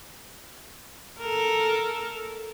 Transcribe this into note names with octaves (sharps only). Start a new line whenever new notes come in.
A4 A#4